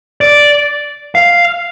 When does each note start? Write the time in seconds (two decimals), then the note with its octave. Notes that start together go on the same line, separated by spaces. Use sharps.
0.21 D5
1.15 F5